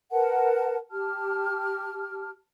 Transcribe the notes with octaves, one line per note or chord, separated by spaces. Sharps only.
A#4 B4 F#5 A5
G4 A5 F6